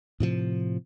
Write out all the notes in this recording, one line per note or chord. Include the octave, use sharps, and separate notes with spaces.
A2 C3 F3